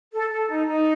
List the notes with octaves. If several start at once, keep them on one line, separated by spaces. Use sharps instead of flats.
A4
A4
D#4
D#4